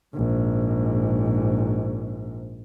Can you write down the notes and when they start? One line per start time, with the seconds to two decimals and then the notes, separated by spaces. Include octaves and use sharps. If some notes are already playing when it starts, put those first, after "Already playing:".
0.14 A#1 G#2